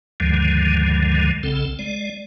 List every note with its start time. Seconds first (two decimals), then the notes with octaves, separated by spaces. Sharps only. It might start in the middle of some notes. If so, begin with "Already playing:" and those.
0.20 D2 G2 D3 D#3 F3 G#3
1.43 B1 C#3 C4 A4
1.79 G#3 D5